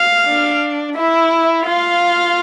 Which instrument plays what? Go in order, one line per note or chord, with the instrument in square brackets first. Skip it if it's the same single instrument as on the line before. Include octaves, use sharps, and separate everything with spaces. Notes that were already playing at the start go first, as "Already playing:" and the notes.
Already playing: [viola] F5
[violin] D4
[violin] E4 [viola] E5
[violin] F4 [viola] F5